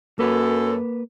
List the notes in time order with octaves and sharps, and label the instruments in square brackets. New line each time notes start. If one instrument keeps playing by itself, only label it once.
[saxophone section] F#2 A4 [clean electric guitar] A#3 B4